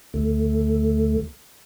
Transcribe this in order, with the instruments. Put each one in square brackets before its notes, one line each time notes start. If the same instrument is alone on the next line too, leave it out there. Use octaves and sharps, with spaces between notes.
[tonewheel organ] D2 A3